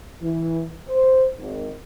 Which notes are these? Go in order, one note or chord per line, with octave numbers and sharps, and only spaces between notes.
E3
C5
G#1